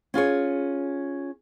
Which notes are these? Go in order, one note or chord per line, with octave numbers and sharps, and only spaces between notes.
C#4 F4 G#4 C#5